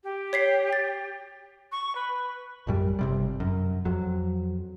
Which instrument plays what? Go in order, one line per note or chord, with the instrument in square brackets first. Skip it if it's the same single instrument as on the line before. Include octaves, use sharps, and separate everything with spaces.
[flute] G4
[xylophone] C#5 B6 C7
A6
[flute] C#6
B4
[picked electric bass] A#1 F#2 G3
G1 C3 G3
F#2
F2 F#3